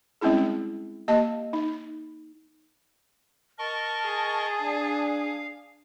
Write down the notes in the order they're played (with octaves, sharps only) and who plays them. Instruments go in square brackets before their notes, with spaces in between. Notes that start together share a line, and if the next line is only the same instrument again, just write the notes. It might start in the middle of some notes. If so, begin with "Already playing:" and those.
[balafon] G3 G#3 C4 C#4 E4 G#4
A#3 G4 D#5 A5
D#4
[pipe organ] A#4 D#5 C#6 [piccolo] A5
[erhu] G#4
[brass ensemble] D4 [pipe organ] F5